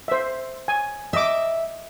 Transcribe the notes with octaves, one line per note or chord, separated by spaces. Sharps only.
C5 E5
G#5
D#5 E5 D6